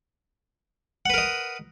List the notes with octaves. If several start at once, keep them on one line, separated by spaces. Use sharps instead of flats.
A#4 B4 D#5 F#5